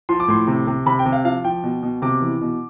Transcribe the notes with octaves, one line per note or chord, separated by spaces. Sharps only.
F3 C6
D6
A2 C6
C3
C3
C3 B5
G5
C3
F5
F3 F5
F3 G5
B2
B2
C3 D6
E3
B2